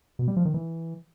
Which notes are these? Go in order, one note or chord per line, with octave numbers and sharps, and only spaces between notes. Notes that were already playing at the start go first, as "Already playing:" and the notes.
B2
G3
F3
D#3
E3